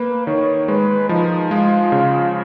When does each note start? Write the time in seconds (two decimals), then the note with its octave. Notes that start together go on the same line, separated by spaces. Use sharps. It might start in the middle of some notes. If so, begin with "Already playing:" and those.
Already playing: A#3 B4
0.27 D#3 C#5
0.68 G#3 B4
1.09 F3 D#4
1.51 G#3 F4
1.92 C#3